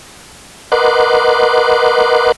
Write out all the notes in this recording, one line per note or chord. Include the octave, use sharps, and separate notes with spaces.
A#4 B4 D#5 F#5 C6 D6